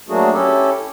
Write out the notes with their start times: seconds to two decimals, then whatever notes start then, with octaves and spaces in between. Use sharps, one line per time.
0.09 F#3 A3 A#3 D4 F#4 G#4
0.33 C#4 E4 G4 A4